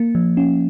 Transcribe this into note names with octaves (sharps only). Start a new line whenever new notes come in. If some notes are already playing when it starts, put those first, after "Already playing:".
Already playing: A#3
F3
C#4